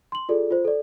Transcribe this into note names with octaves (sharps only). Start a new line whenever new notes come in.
C6 F#7
F4 G#4 A4 D5
F4 C5
A4 D5